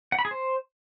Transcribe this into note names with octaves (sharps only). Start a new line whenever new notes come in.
F#5
B5
G#4
C5